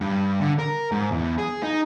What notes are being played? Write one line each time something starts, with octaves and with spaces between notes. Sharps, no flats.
G2
D3
A#4
G#2
E2
G#4
D#4